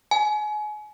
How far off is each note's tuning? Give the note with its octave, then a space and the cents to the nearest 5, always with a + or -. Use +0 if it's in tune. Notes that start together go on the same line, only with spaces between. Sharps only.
G#5 +30